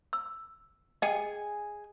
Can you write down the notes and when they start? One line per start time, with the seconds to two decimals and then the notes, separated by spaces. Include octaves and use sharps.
0.13 E6
1.02 G#4 D#5 G5 G#5